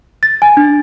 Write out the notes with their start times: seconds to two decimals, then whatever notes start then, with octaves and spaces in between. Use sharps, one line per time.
0.23 A6
0.42 G#5
0.57 D4